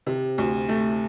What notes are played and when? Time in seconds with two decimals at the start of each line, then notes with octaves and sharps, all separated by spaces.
0.06 C3
0.38 D2
0.69 A3